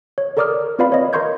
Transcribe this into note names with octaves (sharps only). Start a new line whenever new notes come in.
C#5
A4 A#4 D5 D6 D#6 F6
C4 F4 B4 D5 F5 B5
C#5 D#5
A#4 D#5 C6 C#6 G6 G#6